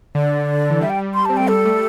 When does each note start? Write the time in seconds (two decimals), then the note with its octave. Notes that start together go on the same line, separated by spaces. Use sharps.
0.15 D3 D5
0.70 E3
0.81 G3 E5
0.90 G5
1.14 C6
1.25 C4 A5
1.37 A3 G5
1.48 G3 A4
1.65 A3